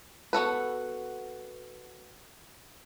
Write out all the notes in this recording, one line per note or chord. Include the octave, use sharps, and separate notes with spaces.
B3 F#4 A4 B4